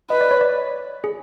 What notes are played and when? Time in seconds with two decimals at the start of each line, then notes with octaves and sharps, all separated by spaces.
0.10 B4 D#5
0.21 D5
0.31 C#5
0.41 D5
1.04 G#4